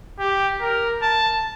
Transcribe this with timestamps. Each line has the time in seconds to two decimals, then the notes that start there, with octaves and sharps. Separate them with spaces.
0.19 G4
0.61 A#4
1.02 A5